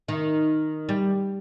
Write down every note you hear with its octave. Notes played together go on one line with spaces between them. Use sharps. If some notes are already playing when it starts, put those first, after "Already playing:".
D#3
G3